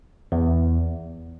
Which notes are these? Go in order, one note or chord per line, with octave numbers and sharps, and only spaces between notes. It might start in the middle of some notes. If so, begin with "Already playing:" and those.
E2